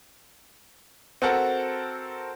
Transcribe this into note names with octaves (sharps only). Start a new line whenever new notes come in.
C4 F#4 A4 A#4 F#5